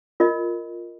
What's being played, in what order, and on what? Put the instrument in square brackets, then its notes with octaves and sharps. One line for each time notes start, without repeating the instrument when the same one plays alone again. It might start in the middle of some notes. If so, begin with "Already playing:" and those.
[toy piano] F4 A#4 D#5